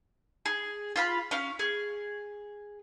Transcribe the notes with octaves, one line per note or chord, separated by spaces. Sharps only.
G#4
F4 F5 B5
C#4 F5
G#4